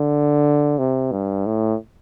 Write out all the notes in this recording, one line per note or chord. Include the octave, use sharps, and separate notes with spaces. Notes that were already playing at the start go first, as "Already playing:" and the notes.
Already playing: D3
C3
G2
A2